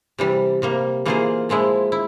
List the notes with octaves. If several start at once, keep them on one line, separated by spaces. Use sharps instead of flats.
C3 E3 G3
C3 G3 A#3
E3 A#3 F4 G#4 C5
A#2 F3 G#3 E4
E4